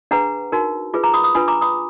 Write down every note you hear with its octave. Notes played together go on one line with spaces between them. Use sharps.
D4 G#4 B4 F#5 A#5
D#4 F#4 A#4
F4 G#4 B4
A#5 D6
B5 D#6
B5 D#6
D4 F4 B4 G#5 B5
A#5 D6
B5 D#6